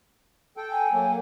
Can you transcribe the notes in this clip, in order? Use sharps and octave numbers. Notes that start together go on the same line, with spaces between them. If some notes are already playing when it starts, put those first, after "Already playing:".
A4 G5
G#5
F#3 A#3